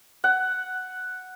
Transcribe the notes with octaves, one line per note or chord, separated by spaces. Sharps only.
F#5